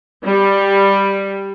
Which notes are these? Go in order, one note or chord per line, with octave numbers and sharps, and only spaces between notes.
G3